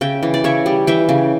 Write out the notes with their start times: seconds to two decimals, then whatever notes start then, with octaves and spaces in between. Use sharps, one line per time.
0.01 C#3 E5 G5
0.23 E3
0.34 D5
0.44 C#3 C#5 E5
0.66 G3
0.87 E3 E5 G5
1.09 C#3